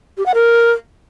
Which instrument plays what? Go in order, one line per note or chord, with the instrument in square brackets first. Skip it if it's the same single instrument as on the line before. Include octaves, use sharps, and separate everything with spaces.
[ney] G4
F#5
A#4